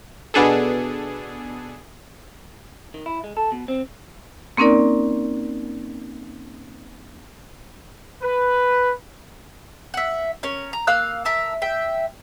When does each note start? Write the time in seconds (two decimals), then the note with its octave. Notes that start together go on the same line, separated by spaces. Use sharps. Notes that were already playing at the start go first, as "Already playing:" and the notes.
0.34 B2 B3 D4 G#4 A4
2.94 D#3
3.06 E4
3.24 G#3
3.37 A4
3.52 B2
3.68 C4
4.57 A#3 C4 C#4 D#4 A#4 D5
8.22 B4
9.94 E5 F#5
10.43 C#4 A#4 C#5
10.73 A#5
10.87 A#3 F5 E6 F#6
11.25 A#4 E5 A5
11.62 E5 G5